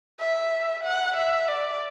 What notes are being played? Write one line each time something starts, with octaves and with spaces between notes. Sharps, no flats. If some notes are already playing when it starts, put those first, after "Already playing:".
E5
F#5
E5
D5